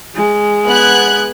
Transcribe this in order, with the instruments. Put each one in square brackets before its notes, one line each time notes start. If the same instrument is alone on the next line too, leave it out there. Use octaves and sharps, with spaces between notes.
[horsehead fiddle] G#3
[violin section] B3 F#6 G#6